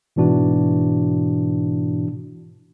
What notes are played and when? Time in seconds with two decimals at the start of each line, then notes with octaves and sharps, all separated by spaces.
0.16 G#2 B2 E3 D4 F#4